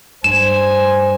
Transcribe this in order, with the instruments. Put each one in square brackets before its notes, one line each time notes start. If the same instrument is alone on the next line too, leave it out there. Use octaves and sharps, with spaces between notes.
[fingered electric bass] G2 [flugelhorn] C5 [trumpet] G#5 [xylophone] E7